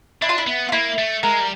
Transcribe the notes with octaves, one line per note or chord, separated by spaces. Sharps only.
D4 E4
F4
E4
B3
F4
A#3 E4
A3
G#3 A#4
G3